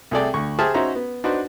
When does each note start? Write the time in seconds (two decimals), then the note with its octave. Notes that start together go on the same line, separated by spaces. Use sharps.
0.11 C2 A3 G#4 A4 D5 G5
0.34 D2 C#6
0.59 G4 G#4 C5 E5 A5 F6
0.74 C#4 D#4 F#4 C5 E5 A#5
0.96 B3
1.24 D4 D#4 F#4 B4 C5